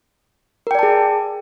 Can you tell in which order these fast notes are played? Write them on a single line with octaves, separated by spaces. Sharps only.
A#4 G5 D5 A5 G#4